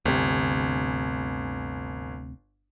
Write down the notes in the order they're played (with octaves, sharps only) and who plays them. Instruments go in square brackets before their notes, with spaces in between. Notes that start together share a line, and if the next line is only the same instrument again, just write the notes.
[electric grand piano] G1 [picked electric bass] D2 C3